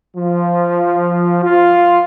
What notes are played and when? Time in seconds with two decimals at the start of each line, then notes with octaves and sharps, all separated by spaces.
0.17 F3
1.44 F4